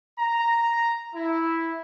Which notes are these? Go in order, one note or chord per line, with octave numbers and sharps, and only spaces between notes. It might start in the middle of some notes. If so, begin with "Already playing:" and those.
A#5
E4